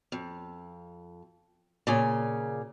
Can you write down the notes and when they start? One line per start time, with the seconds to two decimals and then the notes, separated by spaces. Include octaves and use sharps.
0.12 F2
1.87 A#2 C#3 G#5